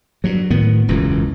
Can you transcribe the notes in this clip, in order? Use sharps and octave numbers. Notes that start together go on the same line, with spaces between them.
G2 F#3
A2 D#3 B3
E1 C#2 F#2 E3